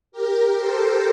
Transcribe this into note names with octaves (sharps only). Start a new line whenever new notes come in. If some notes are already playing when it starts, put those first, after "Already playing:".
G4 A#4
A4 C5